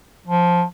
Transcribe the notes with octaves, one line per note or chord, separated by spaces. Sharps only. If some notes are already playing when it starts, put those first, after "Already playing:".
F3